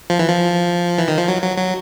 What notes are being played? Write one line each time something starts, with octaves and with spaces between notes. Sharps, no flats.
F3
E3
F3
E3
D#3
F3
F#3
F#3
F#3